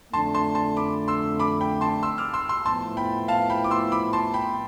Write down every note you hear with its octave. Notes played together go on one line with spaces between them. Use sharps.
F2 D3 A3 D4 A5 C6
A5 C6
A5 C6
B5 D6
C6 E6
B5 D6
G5 B5
A5 C6
C6 E6
D6 F6
C6 E6
C6 E6
A2 F3 B3 E4 A5 C6
G5 B5
F5 A5
G5 B5
D6
C6 E6
B5 D6
A5 C6
G5 B5